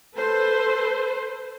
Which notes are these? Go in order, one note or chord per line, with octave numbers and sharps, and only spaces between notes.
A4 B4 C5